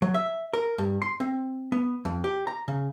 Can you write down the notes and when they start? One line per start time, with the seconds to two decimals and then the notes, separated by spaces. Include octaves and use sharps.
0.02 F#3
0.14 E5
0.53 A#4
0.78 G2
1.02 C6
1.20 C4
1.72 B3
2.05 F2
2.24 G4
2.47 A#5
2.68 C#3